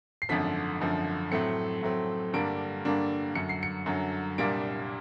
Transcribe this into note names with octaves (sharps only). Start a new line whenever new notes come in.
C7
G#1 F#2 D3 F3 B6
G#1 F#2 D3 F3
A2 F#3 A3 C4 C#7
A2 F#3 A3 C4
G2 D3 G3 A#3 D4 D7
G2 D3 G3 A#3 D4
F#2 D3 F#3 C#7
C7
C#7
F#2 D3 F#3
C2 A#2 G3 A#3 D4 D7